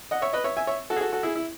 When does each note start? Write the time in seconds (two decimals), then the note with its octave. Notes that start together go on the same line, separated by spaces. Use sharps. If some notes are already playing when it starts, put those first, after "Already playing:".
0.11 D#5 F#5
0.22 C#5 E5
0.33 B4 D#5
0.44 C#5 E5
0.57 E5 G#5
0.67 C#5 E5
0.90 F#4 A4
0.96 G#4
1.01 F#4 A4
1.12 F#4 A4
1.23 E4 G#4
1.36 E4